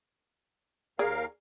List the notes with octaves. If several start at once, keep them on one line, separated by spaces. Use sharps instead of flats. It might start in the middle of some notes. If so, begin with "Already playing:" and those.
D#2 G#4 A#4 D5 F5